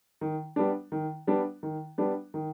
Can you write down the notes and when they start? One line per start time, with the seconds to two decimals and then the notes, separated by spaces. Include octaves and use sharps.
0.21 D#3
0.56 G3 B3 D4
0.92 D#3
1.27 G3 B3 D4
1.63 D#3
1.98 G3 B3 D4
2.34 D#3